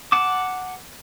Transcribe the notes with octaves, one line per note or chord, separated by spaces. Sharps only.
F#5 A5 D6